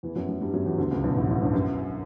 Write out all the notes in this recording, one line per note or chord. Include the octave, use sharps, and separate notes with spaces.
E2 E3
F#2 F#3
F#2 F#3
G2 G3
F#2 F#3
E2 E3
D2 D3
C#2 C#3
B1 B2
G2
A1 A2
A1 A2
G1 G2
F#2